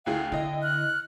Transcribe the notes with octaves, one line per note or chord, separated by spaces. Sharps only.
D2 E4 G#4 F5 G5
D3 E4 D#5
F6 F#6